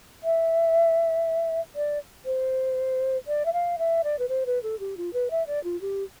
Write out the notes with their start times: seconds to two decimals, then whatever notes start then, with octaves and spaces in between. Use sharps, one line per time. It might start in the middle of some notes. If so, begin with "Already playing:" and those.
0.24 E5
1.76 D5
2.26 C5
3.27 D5
3.45 E5
3.53 F5
3.78 E5
4.04 D5
4.19 B4
4.29 C5
4.46 B4
4.63 A4
4.80 G4
4.97 F4
5.13 B4
5.31 E5
5.47 D5
5.64 F4
5.81 G4